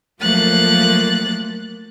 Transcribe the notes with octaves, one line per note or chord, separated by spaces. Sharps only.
F3 F#3 A3 A#3 F#6 A6